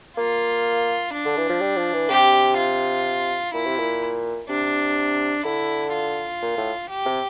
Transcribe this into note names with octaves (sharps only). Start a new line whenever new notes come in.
A#3 F4
D4
D3
E3
F3
G3
F3
E3
C3 G4
F4
A#2 E4
C3
A#2
C3 D4
D3 E4
F4
A#2
A2
G4
C3